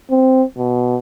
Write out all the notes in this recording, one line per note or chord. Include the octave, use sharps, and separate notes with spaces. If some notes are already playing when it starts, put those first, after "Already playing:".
C4
B2